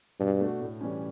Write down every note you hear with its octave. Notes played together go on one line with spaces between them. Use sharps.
G2 B2
A3 D4 F#4
A2
E3 G3 C#4